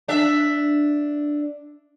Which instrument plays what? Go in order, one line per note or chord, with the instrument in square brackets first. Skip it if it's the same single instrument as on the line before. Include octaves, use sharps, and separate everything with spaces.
[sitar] D4 E5